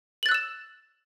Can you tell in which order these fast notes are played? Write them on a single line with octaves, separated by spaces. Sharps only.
F#7 A6 F#6 E6 E7